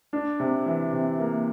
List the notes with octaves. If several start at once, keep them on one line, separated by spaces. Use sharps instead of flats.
D4
C3
E3
C3
A#3